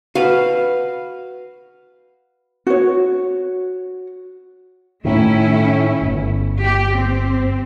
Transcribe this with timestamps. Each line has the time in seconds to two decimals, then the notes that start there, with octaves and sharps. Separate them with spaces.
0.15 F#4 B4 F5
2.67 F#4 C#5
5.05 A2 D#3 A3 C#4 E4
6.02 G1
6.63 G4
6.98 C4